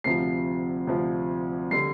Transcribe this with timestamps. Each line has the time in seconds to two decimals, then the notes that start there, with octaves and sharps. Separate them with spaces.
0.04 D2 C3 F3 C7
0.87 D2 C3 F3
1.71 D3 G3 C7